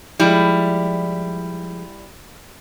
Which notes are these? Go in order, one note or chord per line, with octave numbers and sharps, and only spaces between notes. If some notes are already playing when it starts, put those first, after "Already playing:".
F3 G3 G#3 E4